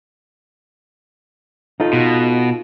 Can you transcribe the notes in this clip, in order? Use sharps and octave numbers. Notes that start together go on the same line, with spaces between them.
D#4 F4 A4
B2